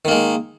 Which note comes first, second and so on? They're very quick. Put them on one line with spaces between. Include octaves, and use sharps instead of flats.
D#3 A#3 G#3